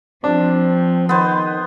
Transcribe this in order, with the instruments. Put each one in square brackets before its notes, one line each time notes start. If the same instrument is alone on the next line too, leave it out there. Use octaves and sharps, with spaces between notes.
[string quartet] F3 [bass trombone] C4 [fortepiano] D4
[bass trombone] D#3 [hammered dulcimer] B3 C5